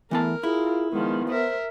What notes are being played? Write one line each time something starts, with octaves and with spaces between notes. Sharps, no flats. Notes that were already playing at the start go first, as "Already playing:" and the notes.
E3 A3 B3 E4 A#4 A5
E4 F4 G#4
D#3 F3 G#3 B3
A#4 C5 E5